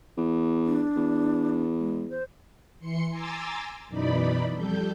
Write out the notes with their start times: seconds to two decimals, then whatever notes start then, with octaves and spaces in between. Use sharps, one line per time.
0.17 E2
0.66 D4
0.97 E2
1.79 G#3
2.10 C5
2.80 E3 C6 C#7
3.10 G#5 A#5 C6 D6 E6 A6
3.88 F#2 B2 E3 D#4 D5 B5
4.53 F2 G3 A4 G6